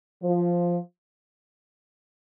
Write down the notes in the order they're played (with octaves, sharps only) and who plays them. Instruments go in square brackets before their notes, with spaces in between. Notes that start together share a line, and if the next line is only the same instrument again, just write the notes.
[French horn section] F3